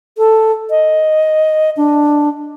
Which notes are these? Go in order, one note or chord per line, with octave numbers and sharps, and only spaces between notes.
A4
D#5
D4